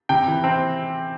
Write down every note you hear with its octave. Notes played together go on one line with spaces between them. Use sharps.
C3 G5
E3
C4